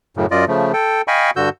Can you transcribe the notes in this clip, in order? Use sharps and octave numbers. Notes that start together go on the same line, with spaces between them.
F#2 A2 C#3
F#2 F4 D5 D#5
C#3 F3 A3
A4 G5
D#5 F5 G5 G#5 B5 C#6
G2 D3 F#4 E6 G6